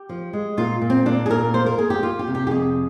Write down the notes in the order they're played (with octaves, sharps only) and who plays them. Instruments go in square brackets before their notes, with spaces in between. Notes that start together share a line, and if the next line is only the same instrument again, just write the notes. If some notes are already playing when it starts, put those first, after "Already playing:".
Already playing: [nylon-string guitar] G4
F3
G#3
A#2 F4
A#2
C4
A#2 D4
G#4
A#2 A#4
A#3 C5
A#4
A#3 G#4
G4
A#3 F4
G4
C3
G4
G4
F2 G#4